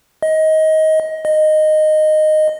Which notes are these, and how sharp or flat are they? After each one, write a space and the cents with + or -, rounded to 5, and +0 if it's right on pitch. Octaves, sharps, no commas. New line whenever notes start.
D#5 +20
D#5 -10